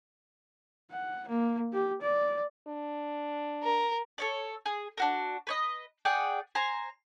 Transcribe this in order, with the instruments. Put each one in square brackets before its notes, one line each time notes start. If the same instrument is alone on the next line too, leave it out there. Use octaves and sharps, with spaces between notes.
[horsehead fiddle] F#5
A#3
G4
D5
[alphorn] D4
[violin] A#4
[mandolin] A4 C#5 D5
G#4
D4 F#4 A#4
B4 C#5 D#5
G#4 D5 F#5 G5
C5 G#5 A#5